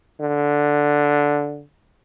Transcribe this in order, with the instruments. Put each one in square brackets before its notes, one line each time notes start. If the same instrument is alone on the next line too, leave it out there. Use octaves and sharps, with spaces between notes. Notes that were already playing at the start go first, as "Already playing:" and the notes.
[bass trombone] D3